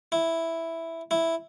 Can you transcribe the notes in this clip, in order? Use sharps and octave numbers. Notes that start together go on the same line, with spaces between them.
E4
E4